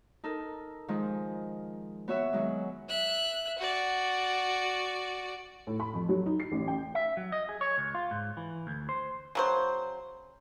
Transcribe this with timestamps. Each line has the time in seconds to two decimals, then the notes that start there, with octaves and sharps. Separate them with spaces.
0.24 D#4 A4 A#4
0.88 D#3 F3 G#3
2.08 B3 F#4 C#5 E5
2.33 D#3 F#3 G#3
2.89 E5 F#6
3.58 F#4 D5
5.67 A2
5.80 B5
5.94 F2
6.09 F#3
6.26 D#4
6.40 C7
6.52 A1
6.68 G5
6.95 E5
7.17 F#3
7.32 D#5
7.49 G#4
7.61 C#5
7.78 C#2
7.95 F4
8.11 G#2
8.37 E3
8.67 D2
8.89 C5
9.35 C#3 F#3 C5